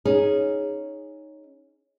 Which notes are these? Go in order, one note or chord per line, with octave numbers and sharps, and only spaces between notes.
C#4 D#4 G#4